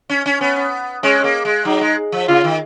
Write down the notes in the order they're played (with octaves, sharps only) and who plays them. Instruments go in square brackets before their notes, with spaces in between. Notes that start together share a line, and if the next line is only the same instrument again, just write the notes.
[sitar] C#4
C#4
[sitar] B3 [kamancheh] C#4
[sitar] G#3 [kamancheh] C#4
[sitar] A#3
G#3
[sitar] F#3 [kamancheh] D#4
[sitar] G#3
F3
[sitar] C#3 [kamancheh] F4
[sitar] D#3